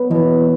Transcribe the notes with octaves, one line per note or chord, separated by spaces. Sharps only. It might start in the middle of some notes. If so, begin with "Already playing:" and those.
Already playing: F#3 B3
B2 E3